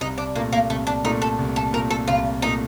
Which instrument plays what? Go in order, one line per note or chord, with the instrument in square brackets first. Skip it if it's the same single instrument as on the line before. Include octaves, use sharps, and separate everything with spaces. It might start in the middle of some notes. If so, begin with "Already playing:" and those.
[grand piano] C2 [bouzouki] D#4
[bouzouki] D4
[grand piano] A#2 A3 [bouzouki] A#3
[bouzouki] A#3
[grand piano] C2 [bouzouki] A3
[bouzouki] D4
[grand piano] A#2 A3 [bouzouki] D#4
[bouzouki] A4
[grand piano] C2
[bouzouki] A4
[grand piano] A#2 A3 [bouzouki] A#4
[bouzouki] A4
[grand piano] C2 [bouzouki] F4
[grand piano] A#2 A3 [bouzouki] D#4